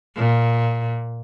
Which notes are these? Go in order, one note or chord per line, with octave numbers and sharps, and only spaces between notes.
A#2